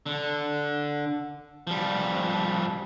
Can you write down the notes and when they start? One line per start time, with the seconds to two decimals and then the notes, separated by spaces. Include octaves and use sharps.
0.06 D3
1.67 F3 G3